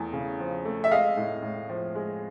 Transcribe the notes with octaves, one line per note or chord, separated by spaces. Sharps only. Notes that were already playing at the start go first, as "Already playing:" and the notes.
Already playing: E2 A3
C#3
F3
A3
E5
G#3 D#5 F5
A2
A2
F3
G#3